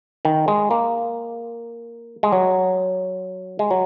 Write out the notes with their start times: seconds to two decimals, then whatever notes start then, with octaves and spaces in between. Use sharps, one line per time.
0.25 D#3
0.48 G#3
0.71 A#3
2.23 G#3
2.32 F#3
3.59 G#3
3.71 F#3